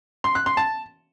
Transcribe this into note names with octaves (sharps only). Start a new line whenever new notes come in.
C6
F#6
C6
A5